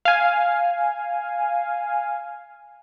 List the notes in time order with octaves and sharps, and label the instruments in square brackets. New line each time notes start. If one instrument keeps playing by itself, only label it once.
[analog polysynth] F5 G#5